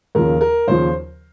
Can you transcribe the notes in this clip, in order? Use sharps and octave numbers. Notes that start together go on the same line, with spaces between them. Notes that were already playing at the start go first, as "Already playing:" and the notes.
D#2 C#3 F3 A#4
A#4
D#2 C#3 F3 C5